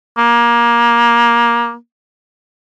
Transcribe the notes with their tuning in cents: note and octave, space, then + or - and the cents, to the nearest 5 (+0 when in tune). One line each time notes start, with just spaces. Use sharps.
A#3 +20